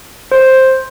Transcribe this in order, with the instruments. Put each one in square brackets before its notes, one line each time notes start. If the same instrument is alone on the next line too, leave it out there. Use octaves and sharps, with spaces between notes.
[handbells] C5